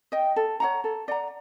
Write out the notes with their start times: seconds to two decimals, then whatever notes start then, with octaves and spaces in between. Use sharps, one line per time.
0.12 D#5 G5
0.36 A4
0.60 C#5 F#5 A#5
0.84 A4
1.08 D5 F#5 A#5